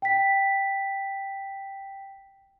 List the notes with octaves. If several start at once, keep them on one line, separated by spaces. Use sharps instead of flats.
G5 B6